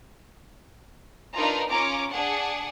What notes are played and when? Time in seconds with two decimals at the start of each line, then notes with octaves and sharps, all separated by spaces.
1.37 D4 D#4 F4 A#4 B4 A#5
1.70 C#4 F4 A#5 D6
2.13 D4 G#4 F#5